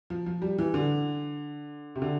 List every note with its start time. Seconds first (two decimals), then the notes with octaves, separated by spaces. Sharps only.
0.10 F3
0.26 F3
0.42 G3
0.58 E3
0.74 D3
1.96 C3
2.02 D3